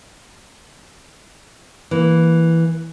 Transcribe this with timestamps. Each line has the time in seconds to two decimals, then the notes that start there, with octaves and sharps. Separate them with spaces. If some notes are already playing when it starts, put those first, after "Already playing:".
1.91 E3 A#3